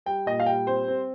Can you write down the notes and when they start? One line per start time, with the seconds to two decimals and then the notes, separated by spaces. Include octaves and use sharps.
0.06 G3 G5
0.26 A#2 D#5
0.40 F5
0.46 G3 G5
0.67 C4 C5
0.88 C4